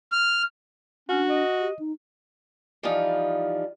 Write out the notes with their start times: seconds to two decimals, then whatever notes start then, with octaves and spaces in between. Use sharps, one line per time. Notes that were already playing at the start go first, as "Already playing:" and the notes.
0.12 F6
1.09 C#4 D4 F#4
1.29 D#5
1.60 G4
1.79 D#4
2.83 E3 F3 G3 D#4 F4